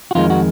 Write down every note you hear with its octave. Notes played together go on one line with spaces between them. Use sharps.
F#4
F2 D#3 G#3 F4
F#4